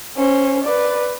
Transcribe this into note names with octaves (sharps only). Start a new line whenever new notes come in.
C#4 C5
B4 D5